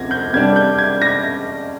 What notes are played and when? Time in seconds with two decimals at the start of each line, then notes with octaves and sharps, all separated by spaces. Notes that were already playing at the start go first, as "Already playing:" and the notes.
Already playing: D2 C3 F3 C4 G#6 A#6
0.11 G6
0.33 C3 G3 D4 G#6
0.56 G6
0.78 G#6
1.02 A#6